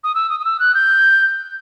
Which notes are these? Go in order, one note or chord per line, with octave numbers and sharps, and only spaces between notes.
D#6
E6
D#6
D#6
E6
F#6
G6